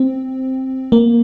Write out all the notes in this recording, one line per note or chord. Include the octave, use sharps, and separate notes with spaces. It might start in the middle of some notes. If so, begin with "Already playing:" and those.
Already playing: C4
A#3